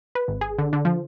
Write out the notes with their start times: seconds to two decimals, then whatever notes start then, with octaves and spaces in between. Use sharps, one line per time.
0.15 B4
0.28 G#1
0.41 G#4
0.59 D3
0.73 D3
0.85 F3